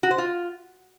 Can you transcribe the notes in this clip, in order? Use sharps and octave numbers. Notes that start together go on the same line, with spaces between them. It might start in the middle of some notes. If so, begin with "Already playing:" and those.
F#4
C5
F4